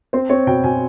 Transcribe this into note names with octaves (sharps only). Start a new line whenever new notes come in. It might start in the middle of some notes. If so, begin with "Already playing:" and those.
C4 C5
C4 C#5
B2 G5
B2 G#5